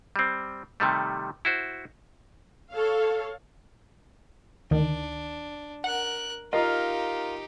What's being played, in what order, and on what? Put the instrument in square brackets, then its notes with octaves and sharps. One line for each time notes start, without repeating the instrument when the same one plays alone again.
[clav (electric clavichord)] G3 C4
C3 D#3 G3 A3
E4 F#4 C5
[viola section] A4 C#5 F5
[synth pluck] D2 D#3 [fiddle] D4
[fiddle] A#4 F#6 [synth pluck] F#5
[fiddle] D#4 G4 [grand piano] F4 A#4 F5 [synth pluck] D#5